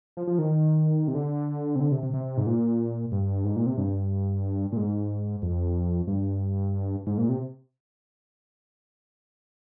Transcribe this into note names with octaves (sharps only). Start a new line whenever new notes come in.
F3
F3
D#3
C3
D3
C3
D3
C3
C3
C3
G#2
A#2
G2
G#2
A#2
C3
G2
A#2
G#2
F2
G2
G#2
A#2
C3